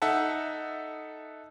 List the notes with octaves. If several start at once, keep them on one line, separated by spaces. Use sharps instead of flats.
D#4 A4 E5 F#5 A5